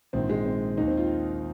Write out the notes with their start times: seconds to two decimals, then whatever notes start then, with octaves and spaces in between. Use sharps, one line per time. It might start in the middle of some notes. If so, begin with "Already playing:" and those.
0.13 A#1 G#2 D#3 C4
0.30 G#3
0.45 C4
0.77 D#2 D#3 D#4
0.87 C4
0.97 F4